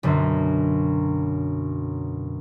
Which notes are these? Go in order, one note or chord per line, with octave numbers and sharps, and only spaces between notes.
B1 F#2 D3